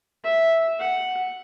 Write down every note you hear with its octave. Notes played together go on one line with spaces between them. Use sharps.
E5
F#5